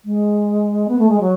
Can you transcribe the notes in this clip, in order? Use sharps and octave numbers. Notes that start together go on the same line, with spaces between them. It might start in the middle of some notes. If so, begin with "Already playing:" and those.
G#3
B3
A3
G#3
F#3